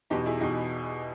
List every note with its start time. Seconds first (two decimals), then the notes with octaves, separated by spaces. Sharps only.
0.10 E2 B2 D#4 G4
0.26 E4 G#4
0.40 E2 B2 D#4 G4